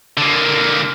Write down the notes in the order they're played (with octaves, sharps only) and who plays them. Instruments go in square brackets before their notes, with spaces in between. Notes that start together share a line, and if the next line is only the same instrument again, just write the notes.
[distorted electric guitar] D3 A#3